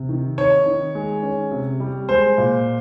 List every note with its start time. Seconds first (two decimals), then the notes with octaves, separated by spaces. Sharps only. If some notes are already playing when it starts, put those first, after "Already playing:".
Already playing: C3
0.09 D#3
0.38 D#4 C#5
0.66 D#3
0.95 G#3
1.23 C#4
1.51 C3
1.80 G3
2.09 G#3 C5
2.38 A#2